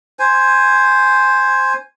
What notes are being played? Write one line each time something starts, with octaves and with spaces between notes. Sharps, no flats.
C5 G#5